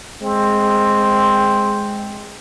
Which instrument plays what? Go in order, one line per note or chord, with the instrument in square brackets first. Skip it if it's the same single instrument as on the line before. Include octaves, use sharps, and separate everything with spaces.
[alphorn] G#3 [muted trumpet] C4